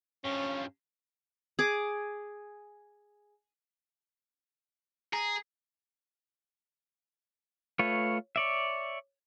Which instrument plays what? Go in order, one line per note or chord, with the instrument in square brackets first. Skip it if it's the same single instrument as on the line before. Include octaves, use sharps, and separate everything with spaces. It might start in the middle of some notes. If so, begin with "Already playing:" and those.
[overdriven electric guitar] G2 F3 [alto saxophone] C#4
[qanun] G#4 D6
[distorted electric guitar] G#4 [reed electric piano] A#5
[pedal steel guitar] A3 F4 B4 C#5
C#5 D5 E5